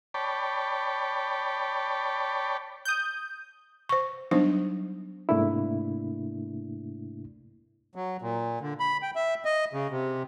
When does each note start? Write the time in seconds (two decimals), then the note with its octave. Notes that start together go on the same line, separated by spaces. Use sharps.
0.14 C#5 D5 G5 A5 B5
2.85 D#6 G6
3.89 C5 C#6
4.31 F#3 G3 B3 D4 D#4 C5
5.29 G#2 C3 A3 A#3 D4 E4
7.95 F#3
8.22 A#2
8.61 D3
8.80 B5
9.02 G5
9.16 E5
9.45 D#5
9.73 C#3
9.90 C3